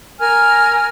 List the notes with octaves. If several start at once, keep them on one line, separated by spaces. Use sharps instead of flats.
A#4 G#5 F6